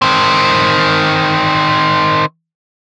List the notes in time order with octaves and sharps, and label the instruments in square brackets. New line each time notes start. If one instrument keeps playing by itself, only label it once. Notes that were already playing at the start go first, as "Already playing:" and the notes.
[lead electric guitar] D#3 C4